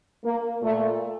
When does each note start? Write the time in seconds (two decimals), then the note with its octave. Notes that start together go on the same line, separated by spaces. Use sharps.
0.24 A#3
0.62 A#2 A3